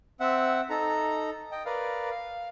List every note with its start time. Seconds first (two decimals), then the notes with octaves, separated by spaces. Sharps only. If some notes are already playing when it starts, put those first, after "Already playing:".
0.20 C4 E5 F#5
0.70 D#4 A4 A#5
1.52 D#5 G5
1.66 A#4 B4 D5 F5
2.11 F5